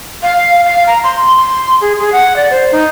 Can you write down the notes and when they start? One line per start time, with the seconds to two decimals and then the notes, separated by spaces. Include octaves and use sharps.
0.23 F5
0.64 F5
0.87 A#5
1.04 C6
1.37 C6
1.81 G#4
1.99 G#4
2.12 F#5
2.36 D5
2.50 C5
2.72 D#4